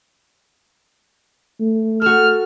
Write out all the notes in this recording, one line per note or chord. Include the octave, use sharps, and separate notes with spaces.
A3
F#4 A4 F6